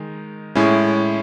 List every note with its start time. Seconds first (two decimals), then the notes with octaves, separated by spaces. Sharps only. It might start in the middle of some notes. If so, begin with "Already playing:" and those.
Already playing: D#3 G#3 D#4
0.55 A2 G#3 C#4 E4